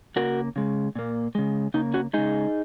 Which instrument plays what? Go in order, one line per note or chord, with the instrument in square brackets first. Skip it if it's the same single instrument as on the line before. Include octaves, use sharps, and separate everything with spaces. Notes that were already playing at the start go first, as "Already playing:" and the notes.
[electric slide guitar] C#3 A#3 F#4 A#4
C#3 G#3
A#2 A#3
C#3 G#3
C#3 A#3 D#4
C#4 F#4
C#3 G#3 D#4 G#4